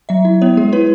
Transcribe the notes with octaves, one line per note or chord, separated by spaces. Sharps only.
F#3 E5
E4
B3 C#5
G#3 G#4
E4 B4